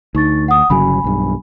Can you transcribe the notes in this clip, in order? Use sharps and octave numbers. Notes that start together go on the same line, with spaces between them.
D2 D#4 C#6 A6
F#5 D#6
G1 C#3 F#3 G#5 B5
B1 G2